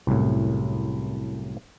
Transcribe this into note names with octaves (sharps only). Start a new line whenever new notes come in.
C2 F#2 A2